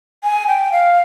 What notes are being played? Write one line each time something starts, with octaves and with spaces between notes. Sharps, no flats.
G#5
G5
F5